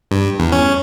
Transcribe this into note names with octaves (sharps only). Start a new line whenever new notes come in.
G2
E2
C#4